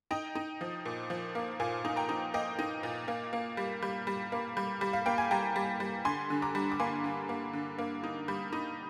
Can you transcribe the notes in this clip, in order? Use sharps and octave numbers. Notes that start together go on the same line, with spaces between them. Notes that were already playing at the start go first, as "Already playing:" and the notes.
D#4 D#5 G5
D#4
F3
A#2
F3
A#3
A#2 F5 G#5
D#4
G5 A#5
D#4
A#3 D#5 G5
D#4
A#2
A#3
A#3
G3
G3
G3
A#3
G3
G3
F5
A#3 G5
G#5
G3 G5 A#5
G3
G3
D3 G#5 C6
D3
A#5 D6
G3
D6
A#3 G#5 C6
D3
A#3
D3
A#3
D#4
G3
D#4